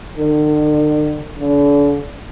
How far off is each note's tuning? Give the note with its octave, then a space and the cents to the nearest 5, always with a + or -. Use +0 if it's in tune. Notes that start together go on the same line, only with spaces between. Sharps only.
D3 +45
D3 -40